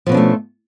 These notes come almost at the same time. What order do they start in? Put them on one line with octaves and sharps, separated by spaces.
F3 B2 C#4 D4 A3